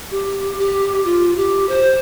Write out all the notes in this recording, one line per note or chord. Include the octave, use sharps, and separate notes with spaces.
G4
G4
F4
G4
C5